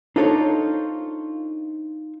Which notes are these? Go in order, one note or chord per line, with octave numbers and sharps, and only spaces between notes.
D4 D#4 F4 A4 C5 C#5